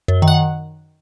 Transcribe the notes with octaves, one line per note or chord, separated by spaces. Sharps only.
F#2
D#3
F#5